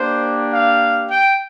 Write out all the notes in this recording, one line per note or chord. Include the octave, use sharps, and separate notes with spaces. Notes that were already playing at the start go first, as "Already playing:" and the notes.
Already playing: A#3 D4 G4 C5
F5
G5